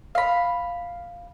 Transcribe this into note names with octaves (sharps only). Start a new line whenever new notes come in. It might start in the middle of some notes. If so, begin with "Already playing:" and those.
F5 B5